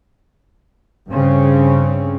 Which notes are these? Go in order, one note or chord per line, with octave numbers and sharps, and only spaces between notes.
G2 C#3 C4 C#4